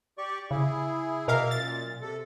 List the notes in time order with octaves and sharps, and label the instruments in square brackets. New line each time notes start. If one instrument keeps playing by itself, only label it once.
[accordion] G4 D5 C#6
[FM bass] C#3 [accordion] E4 G#4
[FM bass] B2 [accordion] A#3 E5 [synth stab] A#4 F5
[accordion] F#2 A#2 [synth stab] A6
[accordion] C3 A4